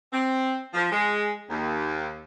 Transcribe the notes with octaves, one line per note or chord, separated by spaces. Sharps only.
C4
F3
G#3
D#2